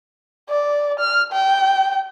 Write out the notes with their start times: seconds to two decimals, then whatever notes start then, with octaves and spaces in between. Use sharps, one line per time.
0.50 D5
0.99 F6
1.32 G5